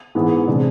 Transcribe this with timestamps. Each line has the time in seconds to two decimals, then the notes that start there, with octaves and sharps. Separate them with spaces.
0.15 G#2 E3 B3 E4 G#4
0.48 C3 G#3 D4 G#4